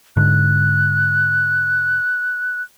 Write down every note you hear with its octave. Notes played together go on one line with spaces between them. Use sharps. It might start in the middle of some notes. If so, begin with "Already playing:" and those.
G#2 D3 F#6